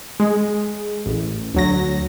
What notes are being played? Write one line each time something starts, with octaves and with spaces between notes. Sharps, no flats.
G#3
A1
D2 F#3 A#6